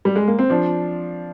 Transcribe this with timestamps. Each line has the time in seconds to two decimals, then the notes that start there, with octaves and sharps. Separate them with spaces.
0.05 G3
0.16 G#3
0.28 A#3
0.39 C4
0.50 F3 D4